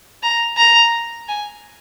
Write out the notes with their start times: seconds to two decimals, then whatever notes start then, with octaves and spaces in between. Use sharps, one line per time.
0.23 A#5
0.57 A#5
1.28 G#5